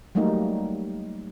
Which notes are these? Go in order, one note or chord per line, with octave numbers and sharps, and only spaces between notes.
F#3 G3 A3 A#3 D#4